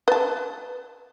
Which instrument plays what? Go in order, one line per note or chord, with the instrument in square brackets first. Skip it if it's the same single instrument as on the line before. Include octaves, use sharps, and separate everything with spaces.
[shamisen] B4 A5